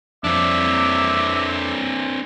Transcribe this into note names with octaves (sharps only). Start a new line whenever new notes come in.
F2 C4 D4 E5 D6